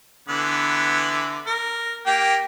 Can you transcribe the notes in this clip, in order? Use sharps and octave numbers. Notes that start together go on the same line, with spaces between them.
D3 E3 B3
A#4
A#3 G4 G5